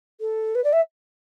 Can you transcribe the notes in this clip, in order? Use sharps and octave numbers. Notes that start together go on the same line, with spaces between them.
A4
B4
D5
E5